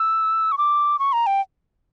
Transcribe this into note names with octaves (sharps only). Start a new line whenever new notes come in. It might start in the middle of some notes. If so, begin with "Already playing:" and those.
Already playing: E6
C#6
D6
C#6
A#5
G5